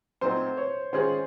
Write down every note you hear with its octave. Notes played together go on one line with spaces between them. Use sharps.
A#2 F#3 A3 C4 D#4 C5
C#5
D#3 G#3 C#4 F4 G#4 C5